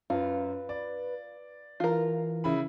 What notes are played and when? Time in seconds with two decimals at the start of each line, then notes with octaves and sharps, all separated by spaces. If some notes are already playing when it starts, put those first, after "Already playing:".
0.10 F#2 F4 B4
0.69 D5
1.80 E3 F4 A#4
2.44 C#3 E4 B5